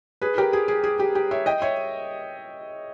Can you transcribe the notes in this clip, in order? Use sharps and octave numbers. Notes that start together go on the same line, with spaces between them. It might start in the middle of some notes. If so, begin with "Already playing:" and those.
G#4 B4
G4 A#4
G#4
G#4
G#4
G4
G4
C#5 E5
D#5 G5
C#5 E5